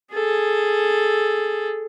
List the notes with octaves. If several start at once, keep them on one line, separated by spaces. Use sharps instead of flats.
G#4 A4